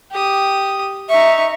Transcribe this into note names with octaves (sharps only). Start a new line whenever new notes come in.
G4 D#6
D#4 E5 C#6